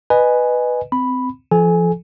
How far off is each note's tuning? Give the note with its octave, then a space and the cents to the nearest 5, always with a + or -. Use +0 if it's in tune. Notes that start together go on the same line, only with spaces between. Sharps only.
B4 +0 D#5 -20 G#5 +0
C4 -25 B5 +0
F3 -25 A4 -35 G#5 +0